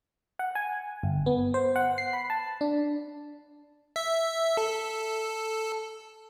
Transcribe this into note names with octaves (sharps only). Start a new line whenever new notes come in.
F#5
G#5
G1
B3
C5
F#5
C7
B5
A5
D4
E5
A4